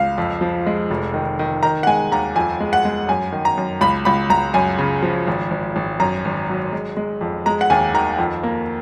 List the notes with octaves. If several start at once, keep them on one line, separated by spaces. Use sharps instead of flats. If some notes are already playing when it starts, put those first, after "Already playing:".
Already playing: C#2 F5
F2
F3
G#3
F1
D#3
D#3
D#3 A#5
F#5
G#3 G#5
D#2 A#5
F2 G#5
G#3
F#5
G#3
F#2 G#5
D#3
A#5
F#2
C#2 B5
C#2 B5
C#2 A#5
F#2 G#5
C#3
F3
G#1
G#1
G#1
F#2 A#5
G#1
F#3
G#3
G#3
F2
G#3 A#5
F#5
D#2 G#5
D#3 A#5
F2
A#3